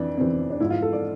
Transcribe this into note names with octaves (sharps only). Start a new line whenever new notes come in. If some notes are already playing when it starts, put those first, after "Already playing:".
Already playing: F2 E3 D4
F2 E3 C4
D4
G#2 F3 E4
F4
A4
D5